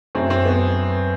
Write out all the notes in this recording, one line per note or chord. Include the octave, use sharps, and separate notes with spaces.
F#2 F#3 A3 C4
C4
B3